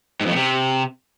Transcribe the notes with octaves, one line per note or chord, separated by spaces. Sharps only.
G#2
F2
A2
C3